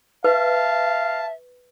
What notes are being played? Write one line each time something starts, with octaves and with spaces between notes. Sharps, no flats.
B4 E5 F5 A5